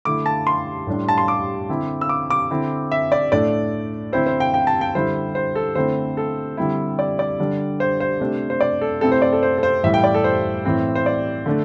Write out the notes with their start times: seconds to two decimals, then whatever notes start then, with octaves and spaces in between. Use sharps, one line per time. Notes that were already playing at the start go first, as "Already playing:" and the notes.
0.05 D3 A3 E4 D6
0.26 A5
0.47 C6
0.87 A2 G3 D4
1.08 A5
1.18 C6
1.28 D6
1.69 D3 C4 E4
2.01 E6
2.09 D6
2.30 D6
2.51 D3 C4 E4
2.92 E5
3.12 D5
3.32 A2 A3 D4 D5
4.13 D3 C4 E4 C5
4.26 C5
4.40 G5
4.54 G5
4.67 A5
4.81 G5
4.95 D3 G3 E4 C5
5.35 C5
5.55 A4
5.75 D3 A3 C4 E4 C5
6.17 A4
6.57 D3 G3 C4 E4
6.99 D5
7.19 D5
7.40 D3 G3 D4
7.80 C5
8.00 C5
8.20 C3 A3 D4
8.50 C5
8.61 D5
8.81 A4
9.01 C3 A3 C4 E4 A4
9.12 C5
9.22 D5
9.33 A4
9.43 C5
9.58 A4
9.63 C5
9.83 A2 E3 G3 E4 E5
9.94 G5
10.04 D5
10.14 A4
10.24 C5
10.65 A2 E3 C4 E4
10.95 C5
11.06 D5
11.46 D3 A3 D4